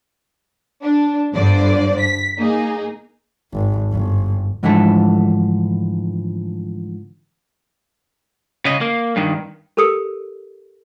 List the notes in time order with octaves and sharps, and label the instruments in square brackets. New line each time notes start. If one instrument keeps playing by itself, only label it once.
[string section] D4
G1 G2 D3 C5 D5
B6
A#3 D#4 G#4
[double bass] G#1
G1
[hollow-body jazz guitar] G#2 D3 E3 F3 A3 A4
[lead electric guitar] C#3 D#5
A#3
G2 D#3
[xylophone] G4 A4 A#4 D#6 E6 C#7